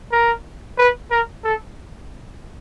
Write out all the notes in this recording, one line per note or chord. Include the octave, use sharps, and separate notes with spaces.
A#4
B4
A#4
A4